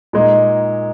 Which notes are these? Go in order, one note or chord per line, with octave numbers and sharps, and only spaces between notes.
A#2 G#3 D#4